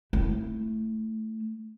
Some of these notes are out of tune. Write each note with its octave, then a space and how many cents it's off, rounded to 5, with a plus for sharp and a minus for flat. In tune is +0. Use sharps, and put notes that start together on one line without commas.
A3 +0 E4 +0